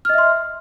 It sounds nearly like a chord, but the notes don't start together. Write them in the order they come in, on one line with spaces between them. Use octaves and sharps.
F6 D#5 E5 C6